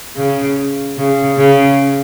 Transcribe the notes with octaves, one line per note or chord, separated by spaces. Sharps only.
C#3
C#3
C#3